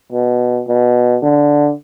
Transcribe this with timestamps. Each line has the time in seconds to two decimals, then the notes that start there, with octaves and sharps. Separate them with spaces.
0.12 B2
0.68 B2
1.23 D3